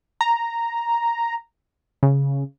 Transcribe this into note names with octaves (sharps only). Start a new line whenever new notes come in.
A#5
C#3